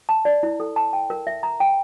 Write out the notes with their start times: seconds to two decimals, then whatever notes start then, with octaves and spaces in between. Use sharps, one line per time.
0.09 A5
0.25 D5
0.43 E4
0.60 A4
0.76 A5
0.93 G5
1.10 A#4
1.27 E5
1.43 A#5
1.60 G5